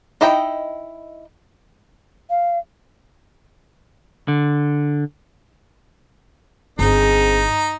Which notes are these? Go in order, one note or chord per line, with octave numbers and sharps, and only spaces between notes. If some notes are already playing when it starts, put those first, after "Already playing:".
D#4 E4 D#5 G5
F5
D3
G1 C4 D#4 G#4